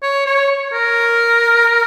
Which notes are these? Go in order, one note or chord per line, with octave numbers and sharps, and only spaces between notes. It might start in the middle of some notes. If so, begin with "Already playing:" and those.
C#5
C#5
A#4